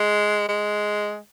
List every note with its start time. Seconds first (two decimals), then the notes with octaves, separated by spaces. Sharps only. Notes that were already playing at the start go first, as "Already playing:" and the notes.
Already playing: G#3
0.48 G#3